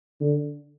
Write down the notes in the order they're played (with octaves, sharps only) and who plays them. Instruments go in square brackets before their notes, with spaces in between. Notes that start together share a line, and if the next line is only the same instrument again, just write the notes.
[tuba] D3